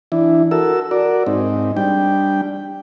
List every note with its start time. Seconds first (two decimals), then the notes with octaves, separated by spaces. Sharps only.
0.12 E3 D4 E4
0.51 F#4 A4 A#4 E6
0.91 F#4 A#4 D5
1.26 G#2 C4 D#4
1.77 G3 D4 G5